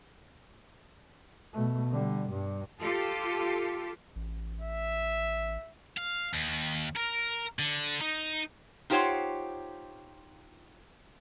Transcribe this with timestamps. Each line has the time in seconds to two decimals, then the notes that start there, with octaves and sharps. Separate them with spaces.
1.53 B2 A3
1.91 D3 G3
2.30 G2 G3
2.80 F4 G4 A4
4.16 A1
4.61 E5
5.97 F5
6.33 D#2
6.97 A#4
7.59 D3
8.01 D#4
8.90 D#4 F4 G4 C5 C#5 F#5